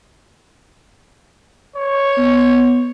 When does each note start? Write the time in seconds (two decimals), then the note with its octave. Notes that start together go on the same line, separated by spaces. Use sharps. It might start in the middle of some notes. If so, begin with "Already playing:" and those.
1.76 C#5
2.18 B3